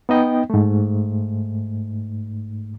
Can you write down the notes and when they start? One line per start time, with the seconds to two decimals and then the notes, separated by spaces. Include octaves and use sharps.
0.09 B3 D#4 D#5 G5
0.50 G#2 A3